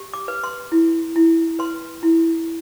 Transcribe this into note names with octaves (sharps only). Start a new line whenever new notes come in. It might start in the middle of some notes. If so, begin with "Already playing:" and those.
Already playing: G4
D6
B4
C6
E4
E4
B4 C6
E4